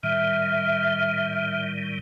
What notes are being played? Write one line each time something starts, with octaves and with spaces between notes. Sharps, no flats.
A2 D#3 G3 E5 F6